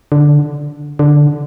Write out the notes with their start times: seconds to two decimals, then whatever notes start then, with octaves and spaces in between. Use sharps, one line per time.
0.12 D3
0.99 D3